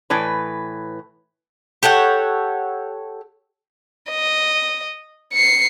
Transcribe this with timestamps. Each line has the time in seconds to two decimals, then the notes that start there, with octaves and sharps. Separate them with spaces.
0.10 A2 E3 B4
1.83 G4 A4 C#5 F#5
4.11 D#5
5.33 C7 C#7